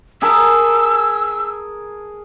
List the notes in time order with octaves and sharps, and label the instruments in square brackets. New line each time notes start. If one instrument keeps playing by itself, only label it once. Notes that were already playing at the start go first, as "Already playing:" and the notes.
[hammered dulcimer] G#4 A#4 A5 [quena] E6